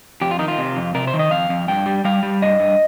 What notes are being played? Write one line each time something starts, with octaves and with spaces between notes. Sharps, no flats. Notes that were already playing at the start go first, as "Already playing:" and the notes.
F2 G4
F4
D#3 D#4
F4
C3
F2
C3 A#4
C5
D#3
D#5
F2 F5
F2
G2 G5
G3
G3 F5
G3
G2 D#5
G2